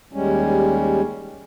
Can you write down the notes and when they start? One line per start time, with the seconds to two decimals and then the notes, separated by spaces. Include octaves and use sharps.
0.13 D#2 G3 G#3 C#4